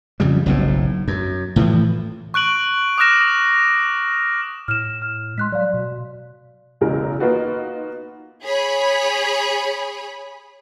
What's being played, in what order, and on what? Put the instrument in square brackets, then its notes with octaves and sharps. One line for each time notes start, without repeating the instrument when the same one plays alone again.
[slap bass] F2 C#3 G3
F#1 B1 A2
F#2
A2 E3 F3
[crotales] C#6 F#6 D7 F#7
D6 D#6 F6 F#6 A#6 E7
[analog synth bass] A2 [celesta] F6 E7
[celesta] F6
[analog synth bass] G#3 [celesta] C6 F#6 B6
[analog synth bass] F#3 [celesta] D5 F5
[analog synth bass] B2
[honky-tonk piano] F#1 B1 E2 C#3 G#3 A#4
A#3 B3 D#4 F4 F#4 B4
[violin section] G#4 C#5 B5